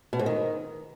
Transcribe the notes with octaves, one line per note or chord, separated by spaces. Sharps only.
B2
G#2
D#3